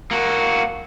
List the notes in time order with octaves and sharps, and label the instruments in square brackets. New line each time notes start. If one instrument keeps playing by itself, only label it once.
[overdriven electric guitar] A#3 F#4